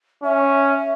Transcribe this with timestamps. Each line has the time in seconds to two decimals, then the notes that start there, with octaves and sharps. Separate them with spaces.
0.23 C#4 E5
0.78 E5